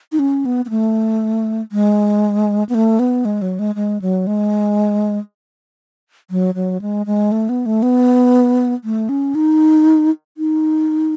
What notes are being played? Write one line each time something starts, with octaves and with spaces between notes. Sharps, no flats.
D#4
C#4
B3
B3
A3
G#3
B3
A3
B3
G#3
F#3
G#3
G#3
F#3
G#3
F#3
F#3
G#3
G#3
A3
B3
A3
B3
A3
C#4
D#4
D#4